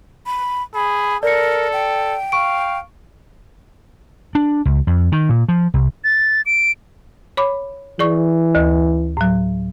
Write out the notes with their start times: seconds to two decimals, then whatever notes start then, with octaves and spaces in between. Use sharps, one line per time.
0.26 B5
0.75 G#4 B5
1.23 A4 A#4 D5 C#7
1.73 G5
2.32 F5 C#6 D7
4.35 D4
4.65 C#2
4.87 F2
5.12 D#3
5.29 A#2
5.49 F3
5.74 C2
6.04 A6
6.46 D7
7.37 C#5 B5 D6
7.99 E3 G#4 D5 C#6
8.55 D2
9.17 A2 F#3